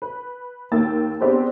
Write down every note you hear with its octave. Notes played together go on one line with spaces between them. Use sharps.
B4
D#2 A#3 G5 E6 A6
B3 C4 D4 G4 G#4 C5